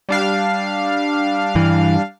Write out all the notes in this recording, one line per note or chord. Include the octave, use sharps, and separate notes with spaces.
G3 D4 F5
G2 E3